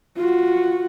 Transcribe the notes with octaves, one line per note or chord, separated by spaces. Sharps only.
F4 F#4